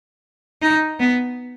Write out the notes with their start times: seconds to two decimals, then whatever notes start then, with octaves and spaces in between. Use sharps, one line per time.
0.62 D#4
1.00 B3